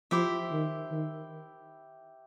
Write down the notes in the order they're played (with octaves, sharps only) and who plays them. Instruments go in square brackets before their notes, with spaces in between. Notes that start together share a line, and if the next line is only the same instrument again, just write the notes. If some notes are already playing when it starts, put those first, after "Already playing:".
[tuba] F3 [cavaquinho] E4 G4 C5 E5
[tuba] D#3
D#3